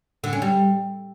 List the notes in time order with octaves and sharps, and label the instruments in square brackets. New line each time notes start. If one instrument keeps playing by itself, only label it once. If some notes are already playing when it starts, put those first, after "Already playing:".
[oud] D3
C#4
G3